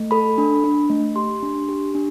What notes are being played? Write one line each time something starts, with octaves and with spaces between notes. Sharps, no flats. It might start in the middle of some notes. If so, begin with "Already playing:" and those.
Already playing: A3
A4 B5
D4
D4
A3
G4 C6
D4
G4
D4